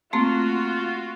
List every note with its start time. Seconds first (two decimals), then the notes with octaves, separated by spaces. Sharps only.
0.13 A3 A#3 C4 F4 F#4